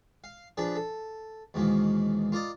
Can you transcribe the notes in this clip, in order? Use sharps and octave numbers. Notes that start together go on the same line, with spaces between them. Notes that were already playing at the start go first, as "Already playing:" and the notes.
F5
F3 D4 G#4 B4
A4
D#2 G#2 B2 E3 A#3
F4 A#4 D5 D#5